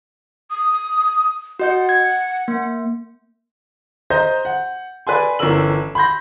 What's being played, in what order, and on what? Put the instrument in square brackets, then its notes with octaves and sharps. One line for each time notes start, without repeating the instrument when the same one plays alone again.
[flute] D#6
[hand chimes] F#4 D#5 G6 [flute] F#5
[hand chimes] G#6
A#3
[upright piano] C5 D#5 A#5 G6
F#5
B4 D5 G#5 C6
G1 E3 C#4 A#4 E6 F#7
B5 C6 G6 A#6